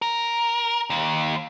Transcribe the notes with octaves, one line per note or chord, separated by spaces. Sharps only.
A#4
D#2